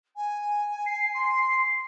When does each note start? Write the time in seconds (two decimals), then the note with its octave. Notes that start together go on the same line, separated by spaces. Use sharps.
0.16 G#5
0.86 C7
1.14 C6